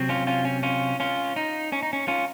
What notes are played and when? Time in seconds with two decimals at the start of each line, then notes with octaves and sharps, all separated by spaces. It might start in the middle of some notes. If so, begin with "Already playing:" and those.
Already playing: C3 F#3 C4
0.09 C#4 F4
0.27 C#4 F4
0.45 C#4
0.63 C#4 F4
1.00 C#4 F4
1.36 D#4
1.72 C#4
1.83 D#4
1.93 C#4
2.08 C#4 F4